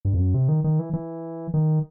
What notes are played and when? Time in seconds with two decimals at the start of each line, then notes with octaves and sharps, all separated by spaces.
0.05 G2
0.14 F2
0.19 F#2
0.34 C3
0.49 D#3
0.64 D#3
0.79 E3
0.93 E3
1.54 D#3